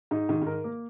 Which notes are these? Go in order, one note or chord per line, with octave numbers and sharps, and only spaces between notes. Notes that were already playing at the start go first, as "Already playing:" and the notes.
G#2 D#4
G#2 D#3
G#2 A#4
A#3